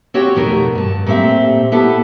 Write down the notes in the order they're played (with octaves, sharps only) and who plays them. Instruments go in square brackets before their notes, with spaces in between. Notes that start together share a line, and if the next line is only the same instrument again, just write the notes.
[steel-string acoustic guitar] C4 F#4 G4 C#5 G5
F2 B2 D#3 A3 A#4
G2 A5
A#2 A3 C4 G4 E5
B3 E4 G4 A4